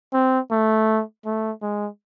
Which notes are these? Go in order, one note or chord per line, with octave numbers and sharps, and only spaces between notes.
C4
A3
A3
G#3